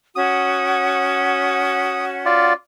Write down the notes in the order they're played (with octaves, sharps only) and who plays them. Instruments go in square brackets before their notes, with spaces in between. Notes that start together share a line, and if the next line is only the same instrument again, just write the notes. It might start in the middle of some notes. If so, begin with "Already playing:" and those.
[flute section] C#4 F#4 F#5 [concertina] D#6
[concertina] F4 D5